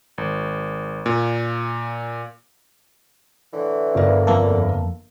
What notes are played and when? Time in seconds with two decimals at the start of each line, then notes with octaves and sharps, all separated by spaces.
0.18 G#1
1.06 A#2
3.54 A2 D3 E3
3.95 G1 A#4 D5
4.27 F2 A#3 A4